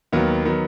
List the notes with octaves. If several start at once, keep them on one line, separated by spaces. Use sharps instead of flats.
D#2 D#3 F#3 B3
D#3 F#3 B3